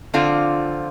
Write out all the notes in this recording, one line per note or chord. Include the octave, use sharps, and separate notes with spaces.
D3 F3 C4 F4